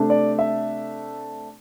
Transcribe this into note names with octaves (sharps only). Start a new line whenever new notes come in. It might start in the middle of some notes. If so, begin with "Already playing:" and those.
Already playing: C3 A3 D4
D5
E5